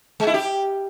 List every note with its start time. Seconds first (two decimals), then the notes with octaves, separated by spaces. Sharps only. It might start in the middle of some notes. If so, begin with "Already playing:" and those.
0.20 G#3
0.27 E4
0.34 G4